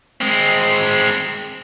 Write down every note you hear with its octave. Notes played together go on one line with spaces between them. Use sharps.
G#3 C4